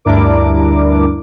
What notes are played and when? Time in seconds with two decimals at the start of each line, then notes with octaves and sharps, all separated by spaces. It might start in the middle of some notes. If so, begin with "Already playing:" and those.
0.05 D2 G2 D4 E4 A#4 D6